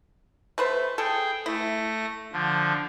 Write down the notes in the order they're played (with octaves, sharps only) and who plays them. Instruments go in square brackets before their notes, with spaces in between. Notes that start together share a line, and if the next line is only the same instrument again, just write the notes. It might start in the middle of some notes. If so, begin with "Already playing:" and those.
[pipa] A3 B4 C5
[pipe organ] G#4 G5 [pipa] A4
[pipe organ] A3 A#6 [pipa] E4
[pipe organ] D3 F3